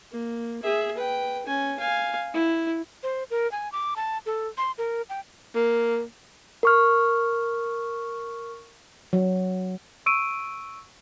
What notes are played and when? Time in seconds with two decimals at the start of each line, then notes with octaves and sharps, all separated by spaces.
0.11 A#3
0.63 G#4 E5
0.97 B4 G5
1.47 C#4 G#5
1.79 F5 G#5
2.35 E4
3.03 C5
3.30 A#4
3.52 G#5
3.72 D6
3.96 A5
4.26 A4
4.58 C6
4.78 A#4
5.09 G5
5.55 A#3
6.63 A#4 C#6 F6
9.13 F#3
10.06 C#6 E6 D7 D#7